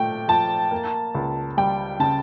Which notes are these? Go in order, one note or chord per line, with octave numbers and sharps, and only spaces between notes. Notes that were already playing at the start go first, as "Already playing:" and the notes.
Already playing: A#2 A3 G5
F3 A5
A#3
C#2
G3 G5
C#3 A5